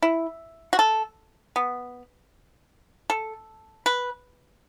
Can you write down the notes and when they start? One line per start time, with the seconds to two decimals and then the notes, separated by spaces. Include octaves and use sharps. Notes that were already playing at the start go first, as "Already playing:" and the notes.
0.02 E4
0.73 F#4
0.79 A4
1.56 B3
3.10 A4
3.86 B4